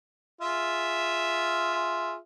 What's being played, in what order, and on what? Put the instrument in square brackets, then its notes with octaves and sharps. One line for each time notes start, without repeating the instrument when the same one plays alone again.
[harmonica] F4 G#4 E5